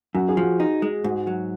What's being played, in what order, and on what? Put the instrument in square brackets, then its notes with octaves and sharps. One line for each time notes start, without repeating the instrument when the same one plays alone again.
[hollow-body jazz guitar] F#2 [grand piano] F#4
[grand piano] G#4
[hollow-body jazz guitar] F3 [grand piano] F#4
[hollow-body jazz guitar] D#4
G#3
[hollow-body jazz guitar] G#2 [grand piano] F#4
[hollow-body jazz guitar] F#3